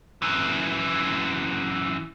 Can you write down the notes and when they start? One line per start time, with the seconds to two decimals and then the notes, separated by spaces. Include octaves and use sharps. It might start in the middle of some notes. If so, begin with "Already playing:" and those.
0.22 F#2 E3